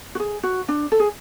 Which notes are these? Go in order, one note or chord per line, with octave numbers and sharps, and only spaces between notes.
F#4
G#4
F#4
D4
A4
G#4